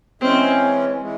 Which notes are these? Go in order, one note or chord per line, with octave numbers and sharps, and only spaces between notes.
E3 G#3 C4 C#4
E3 G#3